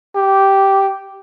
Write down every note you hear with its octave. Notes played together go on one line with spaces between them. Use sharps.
G4